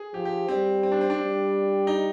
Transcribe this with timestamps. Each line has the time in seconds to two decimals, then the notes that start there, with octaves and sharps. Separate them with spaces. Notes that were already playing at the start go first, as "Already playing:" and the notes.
Already playing: G#4
0.14 F3 G4
0.25 G4
0.49 G3 C4
0.83 C4
0.92 D4
1.01 C4
1.10 D4
1.19 G3
1.87 D#4